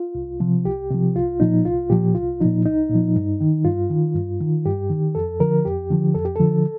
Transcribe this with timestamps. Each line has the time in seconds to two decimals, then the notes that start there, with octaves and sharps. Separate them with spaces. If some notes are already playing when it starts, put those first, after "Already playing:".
Already playing: F4
0.15 C2
0.40 C3 F3
0.65 C2 G4
0.91 C3 F3
1.16 C2 F4
1.40 A#2 F3 D#4
1.65 C2 F4
1.90 A#2 F3 G4
2.15 C2 F4
2.40 A#2 F3 D#4
2.65 C2 D#4
2.90 A#2 F3
3.16 G2
3.40 D#3
3.65 G2 F4
3.90 D#3
4.15 G2
4.41 D#3
4.66 G2 G4
4.90 D#3
5.15 F2 A4
5.40 D3 F3 A#4
5.65 F2 G4
5.90 D3 F3
6.15 F2 A4
6.25 G4
6.36 D3 F3 A4